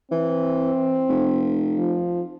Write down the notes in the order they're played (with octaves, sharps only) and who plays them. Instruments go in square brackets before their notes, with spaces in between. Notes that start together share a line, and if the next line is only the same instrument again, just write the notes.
[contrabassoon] E3 [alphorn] C4
[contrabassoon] F1
[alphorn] F3